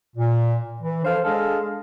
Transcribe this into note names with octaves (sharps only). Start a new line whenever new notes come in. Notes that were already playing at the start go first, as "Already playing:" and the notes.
A#2
E3
F3 D4 A4 C5 F5
G#3 D4 G#4 A4 F5